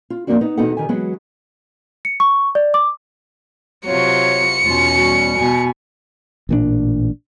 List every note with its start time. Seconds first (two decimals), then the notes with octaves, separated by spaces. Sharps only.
0.10 F4
0.27 F3 A3 A#3 C4 D4 F#4
0.41 B3 D#4
0.57 E2 B2 B3 D#4 A4 F#5
0.77 D#3 G4 G#5
0.89 E3 F#3 G#3 B3 F#4
2.05 C#7
2.20 C#6
2.55 D5
2.74 D6
3.87 C3 F#3 F4 C#5 C#7
4.64 E2 B2 C#4 F4
4.97 G3 F#4
5.37 B2 G#5
6.49 A1 A#2 C#3 D4